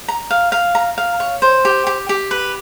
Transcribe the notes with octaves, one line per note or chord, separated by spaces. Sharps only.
A#5
F5
F5
A#5
F5
C#5
C5
G4
G4
G4
B4